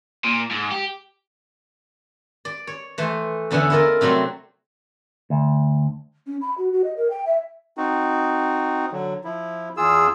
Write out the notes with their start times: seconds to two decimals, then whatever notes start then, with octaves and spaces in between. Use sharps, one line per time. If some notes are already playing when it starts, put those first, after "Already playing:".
0.25 A#2
0.51 G#2
0.72 G4
2.45 D5
2.67 C#5
2.98 E3 A3 C5
3.51 E2 D3 B3 C#4 G#4 E5
3.70 E4 F4 A#4 D5 D#5
4.01 C3 F#3 G3 A3 C4
5.30 D2
6.27 C#4
6.41 B5
6.58 F#4
6.72 F#4
6.84 D#5
6.97 A#4
7.10 G5
7.26 E5
7.77 C4 D#4 F#4
8.92 D3 F#3
9.24 F3 E4
9.77 E2 F4 G#4 E6